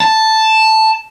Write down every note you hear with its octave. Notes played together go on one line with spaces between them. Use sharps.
A5